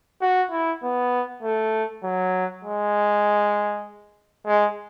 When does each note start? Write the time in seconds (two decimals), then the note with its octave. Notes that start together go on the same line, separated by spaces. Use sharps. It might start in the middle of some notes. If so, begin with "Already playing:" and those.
0.21 F#4
0.51 E4
0.83 B3
1.43 A3
2.03 F#3
2.64 G#3
4.46 G#3